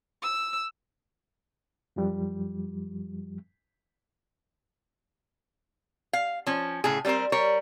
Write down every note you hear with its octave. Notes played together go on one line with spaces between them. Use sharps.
E6
F#2 F3 G3
F5
F3 C#4
A2 C#3 G#4
G3 B3 C4 A#4 C5
G3 A#4 C#5